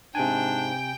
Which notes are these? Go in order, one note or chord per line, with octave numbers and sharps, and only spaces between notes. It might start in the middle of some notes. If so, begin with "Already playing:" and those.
G#2 C3 D4 G5 G#5